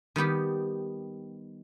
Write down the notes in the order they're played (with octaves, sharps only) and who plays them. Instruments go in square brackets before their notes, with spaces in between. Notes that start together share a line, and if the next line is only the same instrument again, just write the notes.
[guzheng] D#3 G3 B3 G4